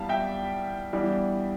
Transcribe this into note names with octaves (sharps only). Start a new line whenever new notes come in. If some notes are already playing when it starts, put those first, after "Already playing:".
Already playing: E3 G3 B3 F5 A5
E5 G5
E3 G3 B3 D4